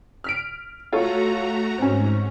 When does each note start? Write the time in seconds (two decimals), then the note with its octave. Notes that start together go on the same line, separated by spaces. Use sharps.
0.24 F6 B6 D7
0.92 A3 F4 F#4 A4 C#5 A#5
1.78 G#2 C4 C#4